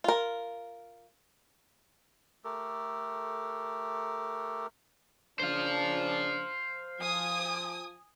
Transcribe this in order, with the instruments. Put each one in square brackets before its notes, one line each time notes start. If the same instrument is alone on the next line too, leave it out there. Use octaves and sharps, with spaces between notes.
[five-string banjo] F4 A#4
[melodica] A3 G4 A4 A#4
[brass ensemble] C#3 A#3 D4 [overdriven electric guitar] C5 F5
[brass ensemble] F3 [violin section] G#5 D#6